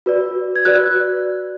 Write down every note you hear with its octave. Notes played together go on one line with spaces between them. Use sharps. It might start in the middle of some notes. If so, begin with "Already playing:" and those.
F#4 B4 D5
G#6
F#4 B4 D5 F#6